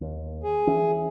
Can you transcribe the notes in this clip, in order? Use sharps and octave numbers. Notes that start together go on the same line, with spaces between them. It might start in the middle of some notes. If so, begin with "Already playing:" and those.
D#2
G#4
E3 C#4